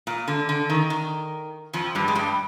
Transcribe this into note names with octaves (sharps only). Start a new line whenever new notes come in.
A#2
D3
D3
D#3
D#3
F2 F3
G2 G3
G#3
G2 G3